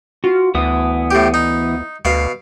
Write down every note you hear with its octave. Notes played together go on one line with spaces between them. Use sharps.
F4 F#4
D2 E3 B3 D#6
A2 G4
D#4
D2 B2 F5